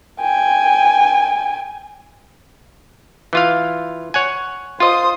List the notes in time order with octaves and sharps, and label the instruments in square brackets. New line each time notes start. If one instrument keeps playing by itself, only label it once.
[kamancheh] G5 G#5
[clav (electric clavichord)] E3 F4 F5
C#5 F#5 G#5
[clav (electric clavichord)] F4 D#5 [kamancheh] C5 D#6